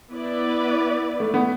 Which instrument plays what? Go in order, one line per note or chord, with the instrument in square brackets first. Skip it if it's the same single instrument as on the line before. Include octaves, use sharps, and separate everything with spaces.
[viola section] B3 E4 B4 D5
[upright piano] A3
B3